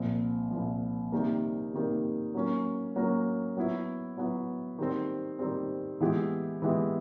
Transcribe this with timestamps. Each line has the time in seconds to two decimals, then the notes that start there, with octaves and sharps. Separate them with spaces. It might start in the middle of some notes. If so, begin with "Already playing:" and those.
Already playing: C2 A#2 F3
0.51 C2 A#2 F3
1.12 C3 D#3 G3 A#3
1.73 C3 D#3 G3 A#3
2.34 F#3 A#3 C#4
2.96 F#3 A#3 C#4
3.57 F#3 B3 E4
4.17 F#3 B3 E4
4.78 D#3 G3 C4
5.39 D#3 G3 C4
6.00 E3 G#3 B3 E4 G4
6.62 E3 G#3 B3 E4 G4